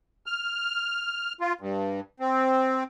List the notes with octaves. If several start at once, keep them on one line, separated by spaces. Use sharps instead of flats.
F6
F4
G2
C4